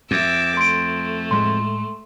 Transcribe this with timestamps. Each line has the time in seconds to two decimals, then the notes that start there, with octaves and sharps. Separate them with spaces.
0.11 F2 E5 D6
0.57 A3 C6 D7
1.31 A2 G#3 C6